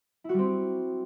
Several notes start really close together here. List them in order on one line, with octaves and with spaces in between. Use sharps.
E4 F#4 G3 C4